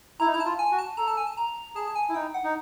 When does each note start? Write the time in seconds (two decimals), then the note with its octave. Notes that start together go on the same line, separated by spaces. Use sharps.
0.20 E4 A#5
0.27 D#4
0.34 E4 A#5
0.40 A5
0.46 F4
0.59 G#5
0.72 F#4
0.79 A5
0.97 A4 A#5
1.08 A5
1.17 G#5
1.27 A5
1.37 A#5
1.75 G#4 A5
1.88 A5
1.96 G#5
2.09 E4
2.15 D#4 G5
2.34 F#5
2.44 D#4